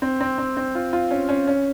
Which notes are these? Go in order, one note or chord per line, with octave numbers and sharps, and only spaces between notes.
C4
C4
C4
C4
F4
F4
C#4
C#4
C#4